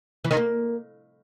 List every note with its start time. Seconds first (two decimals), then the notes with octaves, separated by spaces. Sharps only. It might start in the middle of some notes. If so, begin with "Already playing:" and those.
0.24 E3
0.31 D#3
0.37 A#3